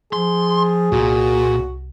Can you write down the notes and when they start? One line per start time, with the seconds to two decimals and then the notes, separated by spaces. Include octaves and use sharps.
0.13 F3 G#4 C6
0.92 C2 A#2 F#4